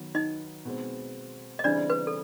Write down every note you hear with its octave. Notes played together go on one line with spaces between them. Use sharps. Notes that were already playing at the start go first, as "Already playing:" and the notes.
Already playing: D#3 F#3 B3
D#4 D#5
B2 G#3 C4
D#5
C#3 E3 G3 C4 D4 D5
B4
A4